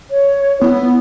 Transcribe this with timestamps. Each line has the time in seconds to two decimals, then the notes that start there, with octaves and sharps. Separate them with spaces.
0.10 C#5
0.61 B3 E4